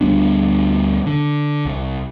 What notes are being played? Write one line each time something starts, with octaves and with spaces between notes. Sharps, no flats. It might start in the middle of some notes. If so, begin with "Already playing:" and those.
D2 G3 B3 D4
D3
C2